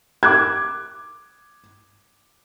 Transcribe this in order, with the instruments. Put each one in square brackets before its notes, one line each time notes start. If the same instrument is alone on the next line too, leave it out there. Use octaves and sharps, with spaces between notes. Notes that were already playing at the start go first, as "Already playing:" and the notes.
[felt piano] D6 F#6 G#6